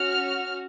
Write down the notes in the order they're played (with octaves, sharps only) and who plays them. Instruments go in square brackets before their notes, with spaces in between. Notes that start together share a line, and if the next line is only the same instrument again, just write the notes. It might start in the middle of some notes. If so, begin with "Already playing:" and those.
Already playing: [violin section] C#4 F#4 F6